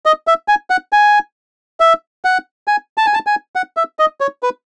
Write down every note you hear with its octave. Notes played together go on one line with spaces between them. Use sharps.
D#5
E5
G#5
F#5
G#5
E5
F#5
G#5
A5
G#5
A5
G#5
F#5
E5
D#5
C#5
B4